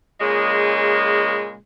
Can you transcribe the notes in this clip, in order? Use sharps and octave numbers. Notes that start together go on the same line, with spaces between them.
A#2 C#3 G#3